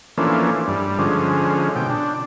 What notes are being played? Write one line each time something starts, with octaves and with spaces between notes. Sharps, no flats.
E3 F3 A3 A#3 C#4 D4
G2 G3
D3 F3 G#3 C#4
B2 G5
D4